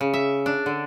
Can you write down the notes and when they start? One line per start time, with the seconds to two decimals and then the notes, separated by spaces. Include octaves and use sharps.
0.01 C#3
0.14 E5
0.46 D4
0.66 D3